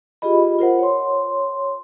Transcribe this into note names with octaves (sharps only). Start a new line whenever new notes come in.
F4 G4 G#4 D#5 B5
F4 A#4 C5 F#5
C#5 C6